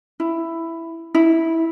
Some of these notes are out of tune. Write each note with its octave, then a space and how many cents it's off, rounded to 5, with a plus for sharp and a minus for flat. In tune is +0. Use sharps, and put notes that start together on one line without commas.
E4 +5
E4 -15